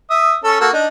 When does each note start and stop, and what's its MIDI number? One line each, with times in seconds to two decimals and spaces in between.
0.10 0.35 76
0.10 0.35 87
0.44 0.58 61
0.44 0.58 69
0.60 0.68 58
0.60 0.68 66
0.60 0.68 69
0.73 0.87 62
0.73 0.87 63